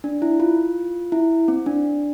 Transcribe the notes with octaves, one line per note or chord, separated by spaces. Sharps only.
D4
E4
F4
E4
C4
D4